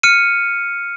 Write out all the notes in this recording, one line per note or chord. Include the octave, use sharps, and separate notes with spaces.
F6 C#7 D#7